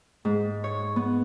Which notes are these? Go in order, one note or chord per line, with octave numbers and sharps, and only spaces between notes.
G#2
C#5
B3